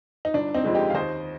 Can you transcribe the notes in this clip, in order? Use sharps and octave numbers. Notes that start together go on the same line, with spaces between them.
D#4
G1 D4
C4 D#4
F2 D3 G#3
D#4 G4
F5
D#2 C5 D#5